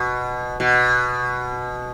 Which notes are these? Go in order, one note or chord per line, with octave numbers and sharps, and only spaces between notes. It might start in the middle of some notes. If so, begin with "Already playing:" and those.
Already playing: B2
B2